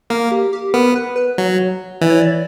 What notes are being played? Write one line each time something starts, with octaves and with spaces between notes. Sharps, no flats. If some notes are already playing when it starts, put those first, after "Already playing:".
A#3 A#4
G4
G4
B3 A#4
B4
B4
F#3
E3 D5
C#5
D5